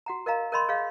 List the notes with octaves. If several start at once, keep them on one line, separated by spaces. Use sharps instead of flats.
F#4 F#5 A#5
A#4 D#5 F5 A#5
A#4 C#5 D#5 B5 C6
G#4 C#5 D#5 F5